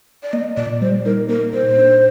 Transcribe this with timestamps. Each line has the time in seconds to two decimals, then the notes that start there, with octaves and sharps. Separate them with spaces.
0.23 D5
0.33 A#3 D#5
0.57 A#2 D5
0.82 G3 C5
1.05 D#4 A#4
1.29 A#3 A#4
1.53 A#2 C5
1.78 D4